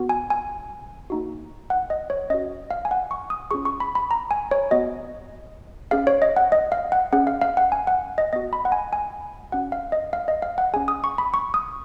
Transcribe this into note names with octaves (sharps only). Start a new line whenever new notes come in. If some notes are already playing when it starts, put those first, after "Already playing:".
Already playing: B3 F#4
G#5
G#5
A#3 D#4 F#4
F#5
D#5
C#5
C#4 F#4 D#5
F5
G#5
F#5
C#6
D#6
C#4 F4 G#4 C#6
C#6
B5
B5
A#5
G#5
C#5
B3 F#4 D#5
C#4 G#4 F5
C#5
D#5
F#5
D#5
F5
F#5
C#4 G#4 F#5
F5
F5
F#5
G#5
F#5
D#5
B3 F#4 D#5
B5
F#5
G#5
G#5
C#4 F#4 F#5
F5
D#5
F5
D#5
F5
F#5
C#4 G#4 G#5
D#6
C#6
B5
C#6
D#6